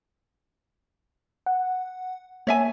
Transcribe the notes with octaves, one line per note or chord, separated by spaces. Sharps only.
F#5
A#3 C#5 E5 G#5